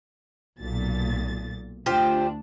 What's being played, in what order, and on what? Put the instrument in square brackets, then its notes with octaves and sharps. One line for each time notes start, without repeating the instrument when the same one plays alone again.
[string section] B1 A#2 A6
[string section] D2 D4 [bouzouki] F4 G4 C5